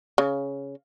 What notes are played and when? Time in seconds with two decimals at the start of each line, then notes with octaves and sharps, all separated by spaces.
0.18 C#3